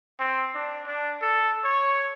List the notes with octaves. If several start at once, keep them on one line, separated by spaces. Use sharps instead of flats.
C4
D4
D4
A4
C#5